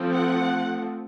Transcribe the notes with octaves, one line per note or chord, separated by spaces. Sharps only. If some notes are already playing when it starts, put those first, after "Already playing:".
Already playing: F3 A3 C4
F#5